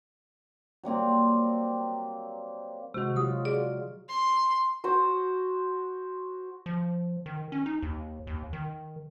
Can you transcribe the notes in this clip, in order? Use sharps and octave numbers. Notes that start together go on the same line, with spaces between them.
F#3 G3 A#3 C4
C3 D#3 G#3 F#4
F#3 F4 G4 F#5 D#6
G#4 D5
C6
F#4 C5
F3
D#3
C#4
D#4
D#2
D#2
D#3